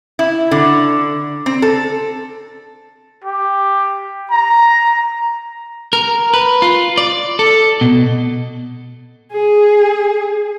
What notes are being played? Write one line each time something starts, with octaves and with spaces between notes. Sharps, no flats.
E4
D3
C4
A4
G4
A#5
A#4
B4
F4
D5
A4
B2
G#4